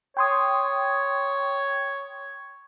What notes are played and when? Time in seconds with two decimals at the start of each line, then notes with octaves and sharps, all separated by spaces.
0.17 C#5 G5 C6 D#6